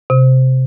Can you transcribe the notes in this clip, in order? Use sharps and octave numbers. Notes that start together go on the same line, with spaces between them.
C3